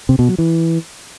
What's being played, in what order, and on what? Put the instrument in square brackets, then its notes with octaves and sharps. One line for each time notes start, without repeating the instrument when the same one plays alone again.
[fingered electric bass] C3
B2
F#3
E3